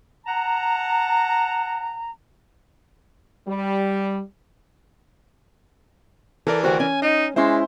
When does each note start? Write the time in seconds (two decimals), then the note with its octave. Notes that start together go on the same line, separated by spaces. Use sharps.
0.26 F#5 A5 A#5
3.47 G3
6.47 E3 A4 A#4 D5
6.63 D2 F#4 G4 C5
6.80 C#4 G#5
7.02 D#4 D#5
7.36 G#3 C#4 E4 C5 E5 C6